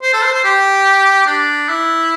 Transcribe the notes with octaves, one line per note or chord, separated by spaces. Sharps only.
C5
A4
C5
C5
G4
D4
E4